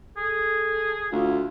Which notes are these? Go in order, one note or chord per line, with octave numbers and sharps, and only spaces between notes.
G#4 A4
D2 F4